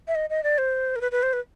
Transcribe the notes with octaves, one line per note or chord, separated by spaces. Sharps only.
E5
D#5
D#5
D5
C5
A#4
B4
B4
C5
B4